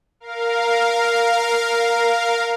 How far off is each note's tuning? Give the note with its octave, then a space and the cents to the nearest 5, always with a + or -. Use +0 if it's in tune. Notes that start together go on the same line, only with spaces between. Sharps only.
A#4 +0 F5 +0